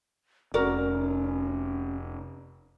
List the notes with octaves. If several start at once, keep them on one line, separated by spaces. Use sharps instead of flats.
F1 C#4 F#4 A#4 D5